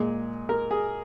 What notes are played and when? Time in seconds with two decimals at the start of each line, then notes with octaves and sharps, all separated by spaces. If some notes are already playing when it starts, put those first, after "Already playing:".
Already playing: A#2 G#3
0.49 A#4
0.71 G#4